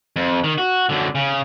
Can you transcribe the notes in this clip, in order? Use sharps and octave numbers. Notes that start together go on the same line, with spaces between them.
F2
D#3
F#4
F#2 D3
C#3